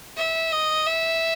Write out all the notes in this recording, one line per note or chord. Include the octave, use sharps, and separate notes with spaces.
E5
D#5
E5